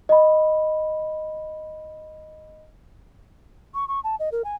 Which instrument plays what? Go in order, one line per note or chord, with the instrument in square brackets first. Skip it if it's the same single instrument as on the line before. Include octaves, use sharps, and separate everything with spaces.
[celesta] D#5 B5
[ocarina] C#6
C#6
A5
D#5
A#4
G#5